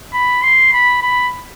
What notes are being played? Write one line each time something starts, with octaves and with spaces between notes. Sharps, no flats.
B5
C6
B5
B5